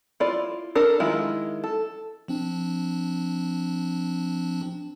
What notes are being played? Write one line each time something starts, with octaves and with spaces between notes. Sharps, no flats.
E4 F4 D5
D4 A4 A#4
D#3 G#3 E4 F4
A4
F3 C4 D4